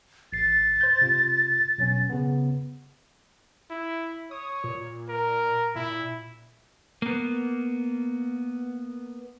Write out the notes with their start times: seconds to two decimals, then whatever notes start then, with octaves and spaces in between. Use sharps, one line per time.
0.33 A1 A6 C7
0.81 C5 G6
1.01 C3 F4
1.78 B2 F#3 C#4
2.10 C#3 B3
3.70 E4
4.31 C#5 D#6
4.64 A#2
5.09 A#4
5.75 A#2 E4
7.02 A#3 B3